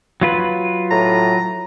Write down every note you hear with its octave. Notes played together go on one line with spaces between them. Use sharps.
F#3 F4 B4
A2 A#5